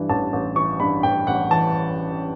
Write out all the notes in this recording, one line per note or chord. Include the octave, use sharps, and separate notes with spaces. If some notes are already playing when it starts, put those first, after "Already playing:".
Already playing: G2 E3
A1 A5
A1
E3 C#6
G2 B5
A1 G5
A1 F#5
E3 A5